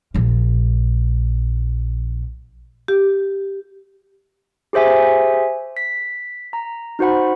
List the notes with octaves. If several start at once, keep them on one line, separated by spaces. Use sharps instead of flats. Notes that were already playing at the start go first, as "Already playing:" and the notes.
A#1 F3
G4
G4 G#4 C5 E5 G#5
B6
A#5
D#4 F#4 C5 F#5 B5